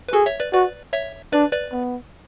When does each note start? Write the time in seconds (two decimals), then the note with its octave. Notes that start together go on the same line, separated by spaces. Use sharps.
0.09 B4
0.13 F#4 G#4 A4
0.26 C#5 E5
0.39 B4 D5
0.53 F#4 B4 D5
0.93 C#5 E5
1.33 D4 B4 D5
1.53 B4 D5
1.73 B3